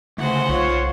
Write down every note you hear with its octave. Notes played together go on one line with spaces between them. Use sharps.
D2 C#3 A3 C5 F#5
B1 F4 C#5